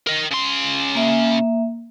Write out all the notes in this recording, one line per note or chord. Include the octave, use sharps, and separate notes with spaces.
A#4 D#5
C#3 C6
A#3 E5